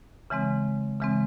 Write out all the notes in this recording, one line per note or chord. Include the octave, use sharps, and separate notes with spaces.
C#3 E3 G#3 C4
C#3 E3 G#3 C4